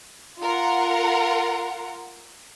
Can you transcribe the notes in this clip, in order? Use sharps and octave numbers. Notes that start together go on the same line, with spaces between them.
F4 A#4 F#5